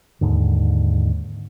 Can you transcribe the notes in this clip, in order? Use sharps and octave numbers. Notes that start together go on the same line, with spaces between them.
D#2 G#2 D3